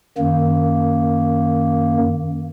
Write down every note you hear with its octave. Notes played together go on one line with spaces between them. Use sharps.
F#2 D#3 A#3